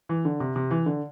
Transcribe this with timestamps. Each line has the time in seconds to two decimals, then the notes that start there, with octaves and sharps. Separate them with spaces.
0.09 E3
0.25 D3
0.40 C3
0.56 C3
0.71 E3
0.86 D3